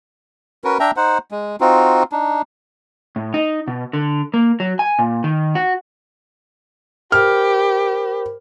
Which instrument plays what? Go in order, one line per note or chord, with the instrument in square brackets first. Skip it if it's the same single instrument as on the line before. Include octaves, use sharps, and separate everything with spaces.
[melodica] C#4 F#4 A#4 B4
D4 E5 G5 A#5
D#4 C5 F#5
G#3
C4 D#4 F4 F#4
D4 D#4
[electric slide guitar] A2
D#4
B2
D3
A#3
F#3
G#5
A#2
D#3
F#4
[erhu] G4 [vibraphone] A#4 C5 B5 [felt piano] F6